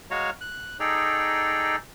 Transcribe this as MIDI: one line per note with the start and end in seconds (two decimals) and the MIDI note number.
0.11 0.30 56
0.11 0.30 66
0.11 0.30 73
0.11 0.30 77
0.11 0.30 82
0.41 0.77 90
0.80 1.76 63
0.80 1.76 68
0.80 1.76 69
0.80 1.76 74
0.80 1.76 79
0.80 1.76 82